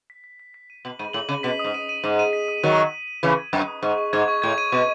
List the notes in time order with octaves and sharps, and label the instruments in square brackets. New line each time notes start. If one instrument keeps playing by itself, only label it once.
[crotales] B6
B6
B6
B6
D#7
[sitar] B2 [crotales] F#7
[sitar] G#2 [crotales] D#7
[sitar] A2 [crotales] F#7
[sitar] C#3 [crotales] D#7
[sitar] B2 [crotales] B6
[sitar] G#2 [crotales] D#6
[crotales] D#7
D#7
[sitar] G#2 [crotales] D#7
[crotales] D#7
B6
D#6
[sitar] D#3 F#3 [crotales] B6
[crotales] B6
B6
B6
[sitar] C#3 E3 [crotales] D#6
[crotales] G#6
[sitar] F#2 [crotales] D#6
[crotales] D#6
[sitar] G#2 [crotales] C#6
[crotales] C#6
[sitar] G#2 [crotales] G#6
[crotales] C#6
[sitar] A2 [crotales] G#6
[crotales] D#7
[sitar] B2 [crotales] C#6